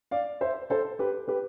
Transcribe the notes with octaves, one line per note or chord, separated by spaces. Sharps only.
D5 F5
C5 E5
A4 C5
G4 B4
G4 B4